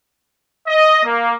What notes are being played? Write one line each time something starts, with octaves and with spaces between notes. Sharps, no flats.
D#5
A#3